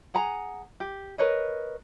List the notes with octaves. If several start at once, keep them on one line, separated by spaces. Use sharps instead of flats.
G#4 F#5 G#5 A#5
G4
A#4 B4 C#5 D#5